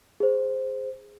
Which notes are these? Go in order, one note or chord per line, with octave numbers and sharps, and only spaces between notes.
G#4 C5